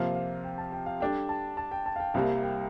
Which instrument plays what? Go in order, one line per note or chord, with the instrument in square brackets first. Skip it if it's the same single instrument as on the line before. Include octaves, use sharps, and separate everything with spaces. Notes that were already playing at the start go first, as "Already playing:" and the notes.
Already playing: [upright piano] C3 F3 A#3 F4 [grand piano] F5
[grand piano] F5
G5
A5
G5
F5
[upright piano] G3 D4 A4 [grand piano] G5
[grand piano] A5
A5
G5
A5
F5
G5
[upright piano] C2 C3 G3 A#3 [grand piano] F5
[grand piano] G5